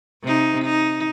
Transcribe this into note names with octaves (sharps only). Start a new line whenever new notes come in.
C3 D#4
D#4